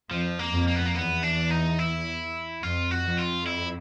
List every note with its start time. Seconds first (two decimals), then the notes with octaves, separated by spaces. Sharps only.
0.11 F2 F3
0.39 A#3
0.53 F2
0.68 A#3
0.76 B3
0.85 A#3
0.95 E2 B3
1.23 D4
1.50 D#4
1.79 E4
2.62 F2 F4
2.91 F#4
3.05 F2
3.19 F4
3.46 E4